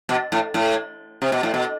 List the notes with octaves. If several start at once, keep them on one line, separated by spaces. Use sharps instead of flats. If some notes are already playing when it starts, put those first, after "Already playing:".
B2
A2
A2
C3
B2
A2
B2